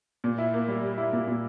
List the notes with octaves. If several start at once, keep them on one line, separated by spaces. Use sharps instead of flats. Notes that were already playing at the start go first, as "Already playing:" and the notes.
A#2
E4
A#3
G3
G3
E4
A#2
A#2